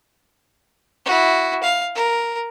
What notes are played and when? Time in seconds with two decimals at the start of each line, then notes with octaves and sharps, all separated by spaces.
1.06 E4 F#4
1.63 F5
1.95 A#4